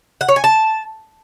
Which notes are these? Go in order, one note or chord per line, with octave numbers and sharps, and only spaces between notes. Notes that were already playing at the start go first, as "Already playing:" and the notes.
F#5
C#5
G#5
A5